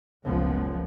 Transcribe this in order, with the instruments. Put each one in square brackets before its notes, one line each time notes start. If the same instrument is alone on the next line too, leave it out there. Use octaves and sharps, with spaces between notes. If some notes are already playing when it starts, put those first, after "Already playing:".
[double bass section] F#1 C#2 F3 G#3 B3